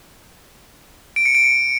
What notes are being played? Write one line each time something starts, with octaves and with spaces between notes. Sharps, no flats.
D7
C#7
D7
C#7